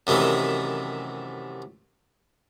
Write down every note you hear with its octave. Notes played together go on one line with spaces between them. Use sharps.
F#2 C3 D#3 E3 A3